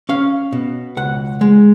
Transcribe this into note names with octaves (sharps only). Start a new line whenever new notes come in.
C#4 F5
B2
C#2 F#5
G#3